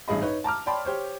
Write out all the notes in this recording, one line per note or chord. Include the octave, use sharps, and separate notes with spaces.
A1 G2 G#4 D#5 B5
D#4 B4 C#5
A5 A#5 D6 F6
C#5 D5 G5 A5 B5 C6
G4 C5 C#5